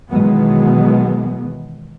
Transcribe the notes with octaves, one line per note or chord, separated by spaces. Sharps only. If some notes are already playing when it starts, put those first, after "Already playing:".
B2 D#3 E3 F#3 G#3 B3